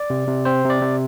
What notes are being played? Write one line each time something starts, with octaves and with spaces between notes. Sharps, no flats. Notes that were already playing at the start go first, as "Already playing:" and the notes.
Already playing: D5
C3
C3
C4 C5
C3
D5
C3